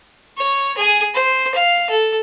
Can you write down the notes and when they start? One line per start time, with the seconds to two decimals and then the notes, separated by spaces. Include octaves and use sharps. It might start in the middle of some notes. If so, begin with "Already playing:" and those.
0.37 C#5
0.78 G#4 G#5
1.14 C5
1.54 F5
1.90 A4